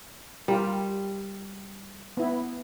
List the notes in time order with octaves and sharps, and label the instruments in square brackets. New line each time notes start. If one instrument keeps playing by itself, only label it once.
[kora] G3 [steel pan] F4 G4 A#4
[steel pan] B3 E4